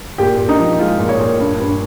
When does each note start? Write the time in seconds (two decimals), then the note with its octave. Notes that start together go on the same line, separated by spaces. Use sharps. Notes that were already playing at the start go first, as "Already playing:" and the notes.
0.18 A#2 G4
0.38 A#2
0.49 D#4
0.59 F3
0.79 G#3 F4
0.99 A#2
1.09 C#5
1.19 A#2
1.40 G2
1.60 G2